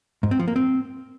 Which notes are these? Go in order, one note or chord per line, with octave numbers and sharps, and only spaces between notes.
G#2
C4
F3
A#3
C4